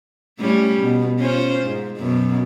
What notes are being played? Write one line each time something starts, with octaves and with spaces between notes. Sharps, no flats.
A2 G3 C#4
B2
C#4 F4 C5
G#2
F#2 B2